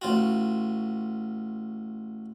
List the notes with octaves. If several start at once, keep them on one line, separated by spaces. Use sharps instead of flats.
A1 F4 F#4